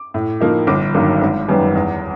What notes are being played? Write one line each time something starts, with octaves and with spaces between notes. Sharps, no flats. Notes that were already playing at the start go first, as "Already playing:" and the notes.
Already playing: D6
A2
F3 A#3 D#4
G1 D6
G2 D#3 F#3 A#3
G#1
F#2 D#3 G3 B3
E2